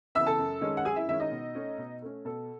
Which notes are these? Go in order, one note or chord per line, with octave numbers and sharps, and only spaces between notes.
C#3 E3 B3 E5 E6
A4 A5
F#2
D#3 G#3 C#4
F#5
F#2 G#4 G#5
E4 E5
D#3 G#3 C#4 E4 E5
D#4 D#5
B2
A3 C#4
B2
A3 C#4
B2 A4